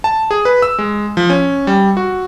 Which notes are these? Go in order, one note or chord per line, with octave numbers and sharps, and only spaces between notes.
A5
G#4
B4
E6
G#3
F3
C#4
G3
F#4